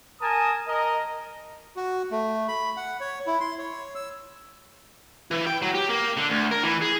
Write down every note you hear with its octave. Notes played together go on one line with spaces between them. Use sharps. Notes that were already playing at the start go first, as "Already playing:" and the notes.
A#4 G#5 A5 D#6
A#4 D#5
F#4
A3
B5
F#5
C#5
E4
C6
C#5
E6
E3
G5
F#3
G4
A#3
D3
D2
A#4
E3
G#4